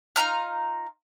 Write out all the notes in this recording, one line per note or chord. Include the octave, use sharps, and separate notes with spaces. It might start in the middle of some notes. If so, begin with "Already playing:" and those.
D#4 F4 A#5 F6